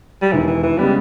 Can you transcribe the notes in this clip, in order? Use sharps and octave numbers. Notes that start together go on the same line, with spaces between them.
G3
E1 D#2 D#3 E3
E3
E3
C#3 G3 G#3 B3 G4 B4